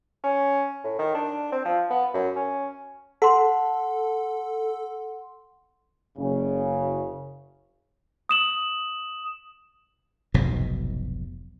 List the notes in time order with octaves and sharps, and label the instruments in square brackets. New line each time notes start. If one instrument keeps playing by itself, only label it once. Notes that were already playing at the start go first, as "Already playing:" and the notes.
[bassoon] C#4
A2
D#3
D4
C4
F3
B3
F#2
C#4
[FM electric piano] A4 [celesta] F#5 C6
[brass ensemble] F#1 C#3
[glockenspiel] D#6 E7 F#7
[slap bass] F1 B1 G#2 B2